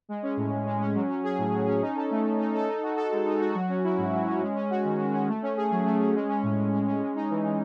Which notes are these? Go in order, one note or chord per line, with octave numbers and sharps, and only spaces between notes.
G#3
C#4
A2
A2
G#3
C#4
F#3
C#4
G#4
A2
F#3
C#4
D#4
A4
A3
A3
D#4
A4
D#4
F#4
A4
G#3
D#4
F#4
F#3
C#4
E4
G#2
F#3
C#4
G#3
C#4
F#4
D#3
G#3
C#4
A3
C#4
G#4
F#3
A3
C#4
G#3
C#4
A2
A2
G#3
C#4
G#3
D#4
E3
E3